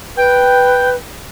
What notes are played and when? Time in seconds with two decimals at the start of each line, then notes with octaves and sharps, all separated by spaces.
0.17 B4 G5